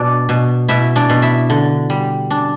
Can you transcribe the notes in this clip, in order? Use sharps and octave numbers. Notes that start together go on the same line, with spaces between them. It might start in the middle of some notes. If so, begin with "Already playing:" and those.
Already playing: B2 D4 D5
B2
B2 E4 E5
D4 D5
B2
E4 E5
D3
G3
D4